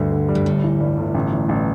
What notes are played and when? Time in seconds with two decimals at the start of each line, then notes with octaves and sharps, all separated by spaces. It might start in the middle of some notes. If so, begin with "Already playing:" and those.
Already playing: D2 G2 D3
0.12 D3
0.29 G3
0.35 G2
0.46 G1 A2
0.64 E3
0.80 G2
0.97 G1
1.14 A1
1.32 E3
1.49 A1